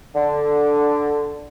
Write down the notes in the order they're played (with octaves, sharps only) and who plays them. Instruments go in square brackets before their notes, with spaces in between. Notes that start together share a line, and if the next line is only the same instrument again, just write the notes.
[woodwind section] D3